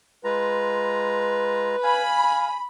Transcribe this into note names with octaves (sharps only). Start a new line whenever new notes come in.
G#3 F4 B4 A#5
F5 G#5 B5